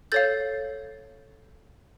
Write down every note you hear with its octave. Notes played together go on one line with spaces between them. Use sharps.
A4 C#5 F5 G6 A6